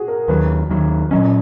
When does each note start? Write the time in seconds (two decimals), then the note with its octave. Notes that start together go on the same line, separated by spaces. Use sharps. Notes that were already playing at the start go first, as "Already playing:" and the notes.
Already playing: F#4 G#4
0.08 A#4
0.28 D#2 D#3 F#3 B4
0.69 D#2 D#3 F#3
1.11 A#2 F#3 C#4 D#5